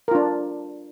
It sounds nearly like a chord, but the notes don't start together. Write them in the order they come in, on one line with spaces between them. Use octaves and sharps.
A#4 F4 D4